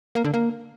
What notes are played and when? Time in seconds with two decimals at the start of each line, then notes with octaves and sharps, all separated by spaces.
0.15 A#3
0.24 D3
0.34 A#3